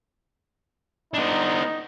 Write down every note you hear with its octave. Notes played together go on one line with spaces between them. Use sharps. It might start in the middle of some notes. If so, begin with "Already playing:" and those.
B3 D4 D#4